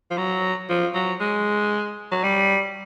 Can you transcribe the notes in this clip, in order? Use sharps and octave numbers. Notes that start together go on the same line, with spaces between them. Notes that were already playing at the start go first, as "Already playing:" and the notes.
F3
F#3
F3
F#3
G#3
F#3
G3